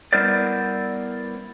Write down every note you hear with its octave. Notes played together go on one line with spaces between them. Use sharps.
G3 B3 E4 A#4 C5 D5